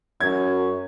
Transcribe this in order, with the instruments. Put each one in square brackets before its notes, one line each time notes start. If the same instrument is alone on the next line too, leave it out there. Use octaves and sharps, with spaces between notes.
[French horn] F#2 [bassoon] C#4 [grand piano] G#6